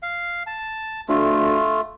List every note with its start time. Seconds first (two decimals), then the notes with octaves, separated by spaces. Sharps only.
0.03 F5
0.47 A5
1.09 D2 A3 F4